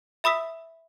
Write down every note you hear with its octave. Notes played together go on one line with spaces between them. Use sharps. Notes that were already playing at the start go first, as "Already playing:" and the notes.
E5 B5 D#6 E6 B6